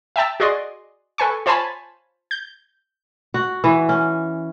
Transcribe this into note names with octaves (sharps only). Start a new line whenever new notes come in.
E5 G5 A5 E6
F#4 G#4 D5 D#5 C6
A4 B4 G#5 C#6
F4 C5 C#5 G#5 A5 B5
G6
F#4
E3
C#4